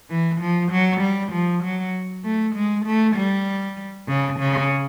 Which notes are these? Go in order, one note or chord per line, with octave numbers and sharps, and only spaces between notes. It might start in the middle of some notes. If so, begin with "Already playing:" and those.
E3
F3
F#3
G3
F3
F#3
A3
G#3
A3
G3
C#3
C#3